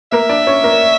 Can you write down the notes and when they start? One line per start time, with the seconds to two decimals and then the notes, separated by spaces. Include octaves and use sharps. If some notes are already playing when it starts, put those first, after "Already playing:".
0.12 A#3 A#4 E5
0.29 D4 D5
0.47 C#4 C#5
0.64 A#3 A#4